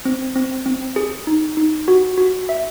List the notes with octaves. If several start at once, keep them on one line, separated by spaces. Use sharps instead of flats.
C4
C4
C4
G#4
D#4
D#4
F#4
F#4
E5